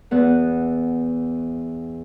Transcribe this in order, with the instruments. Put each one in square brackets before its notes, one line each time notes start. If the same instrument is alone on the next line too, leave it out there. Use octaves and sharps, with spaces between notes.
[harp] E2 B3 F#5